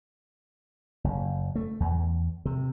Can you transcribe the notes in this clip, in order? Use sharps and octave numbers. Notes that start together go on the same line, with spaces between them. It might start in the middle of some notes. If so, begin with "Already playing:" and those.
F#1
A3
E2
C3